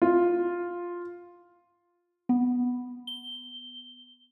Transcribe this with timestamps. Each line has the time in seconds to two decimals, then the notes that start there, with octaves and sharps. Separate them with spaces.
0.02 F4
2.29 B3
3.07 G7